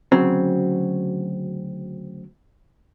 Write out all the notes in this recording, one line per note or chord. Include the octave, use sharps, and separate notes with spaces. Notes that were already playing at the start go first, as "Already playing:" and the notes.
D2 C#3 F#3 C4